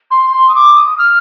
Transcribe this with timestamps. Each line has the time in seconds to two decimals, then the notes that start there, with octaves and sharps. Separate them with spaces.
0.11 C6
0.32 C6
0.48 D#6
0.55 D6
0.75 D#6
0.88 D#6
0.98 F6